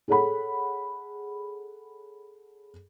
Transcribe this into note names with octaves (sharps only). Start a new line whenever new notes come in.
G#4 A4 C#5 F#5 B5